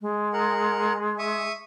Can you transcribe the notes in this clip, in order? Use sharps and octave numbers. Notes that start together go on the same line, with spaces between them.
G#3
A#4 F#5
E5 C#6 D#6